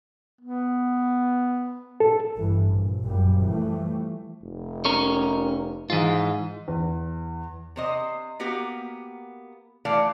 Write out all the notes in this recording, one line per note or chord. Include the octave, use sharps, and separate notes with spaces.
B3
A4
A1 G2 E3
A#1
F#1 F#2 A#2 G3
E3 F3 G3 A3
F1
C#4 A#4 C#5
G#2 E3 F4
E2
C3 C5 D#5
A#3 B3 F#4 G4 A#4
E3 A3 D5 F5